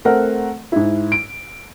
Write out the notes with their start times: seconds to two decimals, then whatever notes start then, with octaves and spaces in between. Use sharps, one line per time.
0.05 A3 C4 A#4 C5 F#5
0.72 G#2 E4
1.12 D7